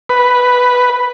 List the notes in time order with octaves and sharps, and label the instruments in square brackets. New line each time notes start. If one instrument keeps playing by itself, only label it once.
[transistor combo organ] B4